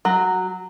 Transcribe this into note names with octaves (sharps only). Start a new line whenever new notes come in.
F#3